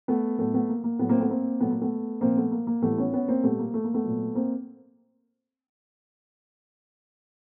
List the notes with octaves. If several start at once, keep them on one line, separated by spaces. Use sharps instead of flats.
A3 B3
A2 F#3 A3 B3
A3 B3
A#3
A#3
A2 F#3 A3 B3
A#3 C4
A3 B3
A#3 C4
A#2 F#3 A3 B3
A#3
A3 B3
A#2 F3 A#3 C4
A3 B3
A#3
A#3
A2 E3 G3 A3 B3
B3 C#4
B3 C#4
A#3 C4
A#2 G3 A3 B3
A#3
A3
A#3
A3 B3
A#2 F#3
A#3 C4